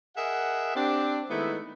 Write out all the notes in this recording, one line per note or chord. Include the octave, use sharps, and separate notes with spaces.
G#4 A#4 D#5 E5 F#5
C4 D4 G4
D#3 G#3 A3 B3 D#4 E4